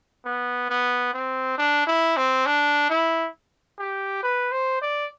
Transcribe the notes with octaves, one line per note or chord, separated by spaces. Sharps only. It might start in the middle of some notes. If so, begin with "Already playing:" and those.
B3
B3
C4
D4
E4
C4
D4
E4
G4
B4
C5
D5